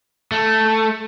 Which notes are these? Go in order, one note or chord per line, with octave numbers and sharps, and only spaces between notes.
A3